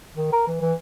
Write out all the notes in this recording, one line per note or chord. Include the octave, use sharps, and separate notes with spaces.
D#3
A#4
E3
E3